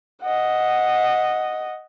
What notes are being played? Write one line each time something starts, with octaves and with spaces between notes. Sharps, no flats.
D#5 F#5